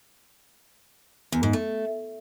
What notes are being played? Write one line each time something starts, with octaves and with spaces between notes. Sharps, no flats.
E2
G#2
A3